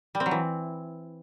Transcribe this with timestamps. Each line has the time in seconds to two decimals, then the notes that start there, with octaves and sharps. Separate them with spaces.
0.15 G3
0.20 C4
0.26 F#3
0.31 E3